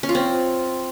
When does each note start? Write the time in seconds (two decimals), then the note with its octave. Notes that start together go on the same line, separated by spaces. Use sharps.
0.03 C#4
0.09 F4
0.15 C4